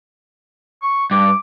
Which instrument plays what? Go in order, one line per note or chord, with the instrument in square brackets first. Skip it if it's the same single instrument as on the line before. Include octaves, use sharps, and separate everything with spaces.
[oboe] C#6
[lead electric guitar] G2 [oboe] D6